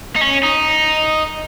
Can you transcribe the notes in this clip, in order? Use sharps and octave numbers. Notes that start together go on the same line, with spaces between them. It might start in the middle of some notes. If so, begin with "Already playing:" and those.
D#4
C#4
D#4